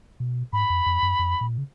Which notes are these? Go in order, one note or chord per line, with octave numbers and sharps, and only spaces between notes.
B2
G#2 B5
F2
F2
F#2
F2
A#2
C#3